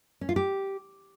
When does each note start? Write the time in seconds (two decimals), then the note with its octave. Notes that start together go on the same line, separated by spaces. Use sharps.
0.21 C#4
0.29 F4
0.36 G4